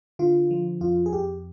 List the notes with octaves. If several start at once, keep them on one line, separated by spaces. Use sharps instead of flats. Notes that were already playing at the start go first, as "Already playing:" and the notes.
D3 F4
F3
F2 F4
G#4
F2 G4